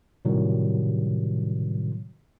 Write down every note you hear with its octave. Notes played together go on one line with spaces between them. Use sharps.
A2 C3 D#3 F#3 G3